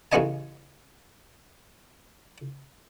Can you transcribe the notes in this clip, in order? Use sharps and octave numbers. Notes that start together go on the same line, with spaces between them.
A1 C#3 B3 C#4 D#5 G#5